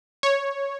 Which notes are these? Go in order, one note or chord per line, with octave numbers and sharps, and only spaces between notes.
C#5